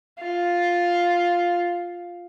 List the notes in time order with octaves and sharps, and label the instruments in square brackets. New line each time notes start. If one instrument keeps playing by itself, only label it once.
[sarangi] F4